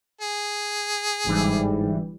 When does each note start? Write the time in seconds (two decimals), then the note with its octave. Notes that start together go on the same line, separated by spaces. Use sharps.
0.21 G#4
1.26 G1 G#2 E3 G3